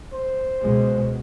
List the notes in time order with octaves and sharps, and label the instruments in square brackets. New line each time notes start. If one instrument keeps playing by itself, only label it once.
[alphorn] C5
[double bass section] C#2 B2 G#3